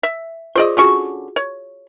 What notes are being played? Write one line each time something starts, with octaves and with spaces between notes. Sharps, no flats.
E5
F4 G#4 C5 D5 D#5
D3 C#4 F4 F#4 G#4 C#6
C#5